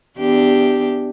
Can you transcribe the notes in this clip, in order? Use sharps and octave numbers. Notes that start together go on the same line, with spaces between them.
E2 D4 G4